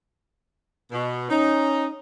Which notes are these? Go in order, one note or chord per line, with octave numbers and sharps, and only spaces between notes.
B2
C#4 D#4